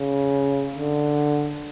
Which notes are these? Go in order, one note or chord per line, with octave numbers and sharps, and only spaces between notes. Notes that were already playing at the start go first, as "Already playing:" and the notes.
Already playing: C#3
D3